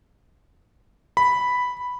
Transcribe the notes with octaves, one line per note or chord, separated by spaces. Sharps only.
B5